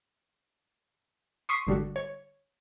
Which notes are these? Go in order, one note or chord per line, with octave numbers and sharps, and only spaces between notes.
C6 C#6 D#6 B6 C7
G#1 D3 G3 F#4
C#5